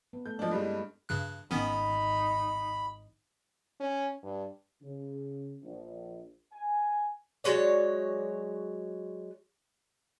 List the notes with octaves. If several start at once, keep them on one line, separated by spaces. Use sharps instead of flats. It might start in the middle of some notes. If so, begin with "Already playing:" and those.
B3
A3 A4 G6
F3 G#3 D4 D#5
G2 G3 G#3 E4 A4
D4 E4
G2 C#3 F#6
G#1 D#3 B3 C#4 D#4 B5
C#4
G2
C#3
A#1
G#5
F#3 G#3 C#5 D5